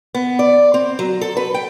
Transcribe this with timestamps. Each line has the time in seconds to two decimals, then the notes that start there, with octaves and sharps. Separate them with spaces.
0.15 B3
0.39 D5
0.74 C4
0.99 F#3
1.21 A4
1.37 B4
1.54 G5